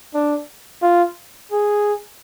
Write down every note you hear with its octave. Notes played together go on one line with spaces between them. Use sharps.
D4
F4
G#4